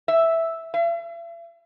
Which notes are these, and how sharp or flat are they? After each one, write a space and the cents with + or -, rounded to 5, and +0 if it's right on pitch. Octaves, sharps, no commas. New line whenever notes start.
E5 +0
E5 +45